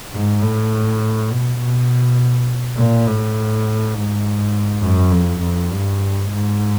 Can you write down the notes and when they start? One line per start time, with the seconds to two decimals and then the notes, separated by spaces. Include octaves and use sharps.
0.13 G#2
0.42 A2
1.31 B2
1.60 B2
2.77 A#2
3.06 A2
3.94 G#2
4.83 F#2
5.11 F2
5.41 F2
5.71 G2
6.29 G#2